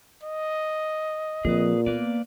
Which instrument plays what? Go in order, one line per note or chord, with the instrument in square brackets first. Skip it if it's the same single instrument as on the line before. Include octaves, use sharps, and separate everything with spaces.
[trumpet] D#5
[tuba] A#2 [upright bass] F3 C4 [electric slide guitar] G#4 B4
[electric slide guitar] A#3 B4 D5 [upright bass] B3